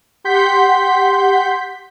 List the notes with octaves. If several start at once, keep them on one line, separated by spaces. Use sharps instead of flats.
G4 F#5 C6 G6 B6